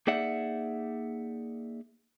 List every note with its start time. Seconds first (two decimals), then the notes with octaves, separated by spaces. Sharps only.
0.07 A#3 D#4 G#4 D5 E5 F#5